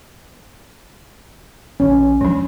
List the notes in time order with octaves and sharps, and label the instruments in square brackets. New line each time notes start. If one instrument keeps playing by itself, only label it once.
[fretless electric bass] A#1 E3 [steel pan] C#4
[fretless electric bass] D#2 F#3 G#3 [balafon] F3 D4